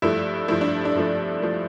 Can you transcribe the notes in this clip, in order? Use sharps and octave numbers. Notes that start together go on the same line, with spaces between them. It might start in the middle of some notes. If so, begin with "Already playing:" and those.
G2 F3 A3 E4
G2 F3 A3 E4
D4
D4
G2 F3 A3
F3 A3